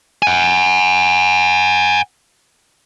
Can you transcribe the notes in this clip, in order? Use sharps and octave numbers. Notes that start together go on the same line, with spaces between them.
F#5 G#5